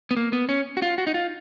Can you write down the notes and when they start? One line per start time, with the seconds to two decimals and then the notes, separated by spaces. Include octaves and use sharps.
0.11 B3
0.17 A#3
0.33 B3
0.49 C#4
0.77 F#4
0.82 F4
0.98 F#4
1.07 D#4
1.14 F4